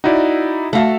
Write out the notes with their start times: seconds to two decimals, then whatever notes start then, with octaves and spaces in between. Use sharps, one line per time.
0.04 D#4 E4 F#4 D5
0.73 A3 F#4 E5 F5 A5